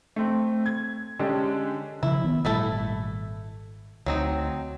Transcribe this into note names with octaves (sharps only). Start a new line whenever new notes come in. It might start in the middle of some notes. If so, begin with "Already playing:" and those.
A3 C4
G#6
D3 G#3 C#4 D4 G4 A4
C#3 F3 E4
D#3 B3
G#1 A#2 G3 A3 E4 A4
D2 F#3 C4 D#4